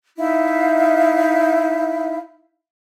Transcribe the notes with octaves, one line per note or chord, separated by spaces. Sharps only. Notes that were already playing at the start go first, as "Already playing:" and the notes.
D#4 E4 E5 F5